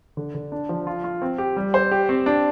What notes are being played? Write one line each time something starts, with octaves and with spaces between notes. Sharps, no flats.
D3
D3
D4
F3
F4
F4
C4
G4
G3
C5
G4
C4
D4